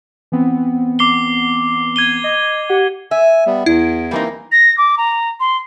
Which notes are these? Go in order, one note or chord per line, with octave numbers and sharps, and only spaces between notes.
E3 B3 C4
D6 C7 G7
G#6 D#7 G7
D#5
G4 F#5
E5 G#5
G3 B3
E2 E4
E3 G3 A#3 C4 D#4
A#6
D6
A#5
C6